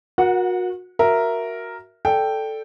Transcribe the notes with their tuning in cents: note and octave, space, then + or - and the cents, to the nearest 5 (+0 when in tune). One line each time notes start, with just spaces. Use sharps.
F#4 -30 A#4 +30 F#5 -5
F#4 +0 A#4 +0 E5 +5
A4 +0 D5 +0 G5 +0